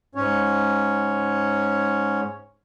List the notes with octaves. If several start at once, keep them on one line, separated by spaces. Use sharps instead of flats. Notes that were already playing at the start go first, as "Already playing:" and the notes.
G#2 C#4 C#5